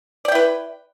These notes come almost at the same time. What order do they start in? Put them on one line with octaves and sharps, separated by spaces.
D5 G5 E4 B4